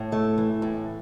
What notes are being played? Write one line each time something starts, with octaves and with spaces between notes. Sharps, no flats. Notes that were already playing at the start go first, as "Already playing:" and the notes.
Already playing: A2
A3
E3
A2